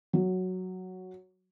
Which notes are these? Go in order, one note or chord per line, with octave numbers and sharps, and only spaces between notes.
F#3